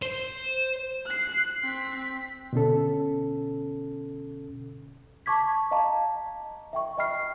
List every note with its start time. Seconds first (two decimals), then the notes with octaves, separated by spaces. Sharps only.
0.02 C5
1.06 F#6 C7
1.63 C4 B6
2.53 B2 D3 C#4 A4
5.26 A5 C#6 D6 G#6 B6
5.71 D#5 F5 A5 A#5
6.73 E5 G5 C#6
6.98 D#5 E5 G5 B5 F6 C7